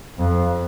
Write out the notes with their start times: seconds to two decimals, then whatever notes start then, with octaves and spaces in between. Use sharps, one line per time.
0.19 F2